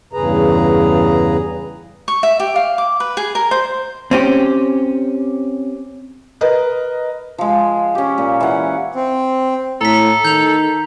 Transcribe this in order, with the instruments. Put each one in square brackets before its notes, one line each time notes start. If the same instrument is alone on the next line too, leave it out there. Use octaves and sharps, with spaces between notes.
[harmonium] E2 G2 C#3 G#4 B4 A#5
[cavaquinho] C#6
E5
G4
F5
D6
B4
G#4
A#4
C5
[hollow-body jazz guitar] C4 C#4 G4
[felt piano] A#4 B4 D#5
[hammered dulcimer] F3 G#3
C#4 G4
A#2
E3 F#5
[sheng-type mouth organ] C4
[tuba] A2 [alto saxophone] A4 [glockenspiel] A#5 B6
[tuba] D#3 [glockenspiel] G6 F7